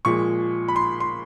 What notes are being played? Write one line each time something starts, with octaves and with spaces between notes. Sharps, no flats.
A#2 F3 G#3 C#6
B5
C6
C6